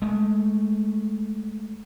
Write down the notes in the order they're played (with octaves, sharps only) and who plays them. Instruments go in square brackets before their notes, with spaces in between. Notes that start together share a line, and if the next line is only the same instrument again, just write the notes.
[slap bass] G#3 A3